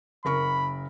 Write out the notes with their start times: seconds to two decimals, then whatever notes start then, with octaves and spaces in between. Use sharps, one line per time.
0.25 F#1 A#4 B5 C#6